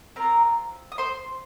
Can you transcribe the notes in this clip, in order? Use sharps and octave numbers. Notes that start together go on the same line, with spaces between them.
C4 F4 A#4 A#5
D#6
C5 C6